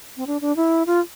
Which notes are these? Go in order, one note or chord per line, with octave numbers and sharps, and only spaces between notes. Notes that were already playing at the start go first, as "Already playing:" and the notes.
C4
D4
D4
E4
F4